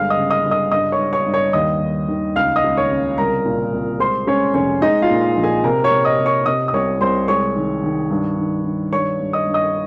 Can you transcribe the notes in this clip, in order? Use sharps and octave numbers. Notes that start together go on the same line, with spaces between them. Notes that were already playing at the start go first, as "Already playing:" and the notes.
Already playing: G1 G#3 F5 F6
D#5 D#6
C#3
D#5 D#6
G1
D#5 D#6
G2 D#5 D#6
C#5 C#6
G2
C#5 C#6
G2
C#5 C#6
D#2 D#5 D#6
D#2
D#3
C#2 F5 F6
D#5 D#6
C#2
C#5 C#6
C#3
C2 A#4 A#5
A#2
C2
G#3 C5 C6
G#3 C#4 C#5
F1 C#4 C#5
G#3 D#4 D#5
F4 F5
A#2
A#1
G#4 G#5
C3 A#4 A#5
C#5 C#6
C3
D#5 D#6
C3
C#5 C#6
C3 D#5 D#6
D#6
C2 C#5 C#6
C2 C5 C6
G#3 C#5 C#6
D#3
D#3
G2
D#3
D#3
G2 C#5 C#6
G2
D#5 D#6
G2
D#5 D#6